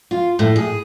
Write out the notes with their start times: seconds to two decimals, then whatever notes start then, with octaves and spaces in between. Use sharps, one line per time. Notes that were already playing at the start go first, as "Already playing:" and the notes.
0.11 F4
0.39 A2
0.56 G#4